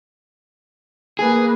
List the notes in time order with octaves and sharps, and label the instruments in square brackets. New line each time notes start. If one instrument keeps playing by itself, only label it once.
[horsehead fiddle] A#3 B4 [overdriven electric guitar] G#4